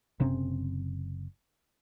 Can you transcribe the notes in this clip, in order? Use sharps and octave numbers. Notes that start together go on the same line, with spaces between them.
F#1 C3 C4 C#4